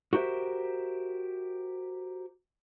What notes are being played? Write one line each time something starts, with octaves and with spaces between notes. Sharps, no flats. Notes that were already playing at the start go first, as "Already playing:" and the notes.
F#4 G4 A#4 C5 E5